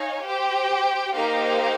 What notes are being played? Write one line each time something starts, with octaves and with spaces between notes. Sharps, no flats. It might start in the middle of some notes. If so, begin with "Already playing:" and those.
Already playing: D#4 C#5 F5 G#5
G4 C5 G5
A#3 D#4 G4 C5 F5